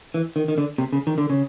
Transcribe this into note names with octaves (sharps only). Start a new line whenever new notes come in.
E3
D#3
D#3
D3
C3
C#3
D#3
D3
C#3